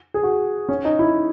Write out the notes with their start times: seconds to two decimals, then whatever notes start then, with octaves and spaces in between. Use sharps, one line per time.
0.14 G#4
0.23 F#4
0.69 C#4
0.85 D#4
0.99 E4